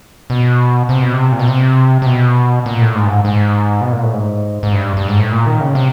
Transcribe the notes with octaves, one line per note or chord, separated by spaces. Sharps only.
B2
C3
B2
C3
A#2
B2
C3
C3
B2
A#2
A2
G#2
G2
G#2
G#2
B2
A#2
A2
G#2
G#2
G2
G2
G#2
A2
A#2
D#3
C#3
C3